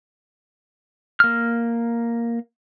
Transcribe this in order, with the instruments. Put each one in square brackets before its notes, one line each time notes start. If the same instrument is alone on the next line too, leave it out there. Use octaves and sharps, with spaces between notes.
[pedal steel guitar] A#3 F6